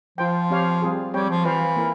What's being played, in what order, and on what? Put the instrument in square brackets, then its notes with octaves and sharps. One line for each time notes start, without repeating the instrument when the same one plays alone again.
[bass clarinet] F3 [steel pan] F4 C5 G5
[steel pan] C4 G4 C#5 F5
G3 C4 F4 G#4
[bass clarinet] G3 [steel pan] C4 G4 C#5 G5
[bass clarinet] F3
[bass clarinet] E3 [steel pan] F4 C5 F5
[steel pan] A#3 E4 A#4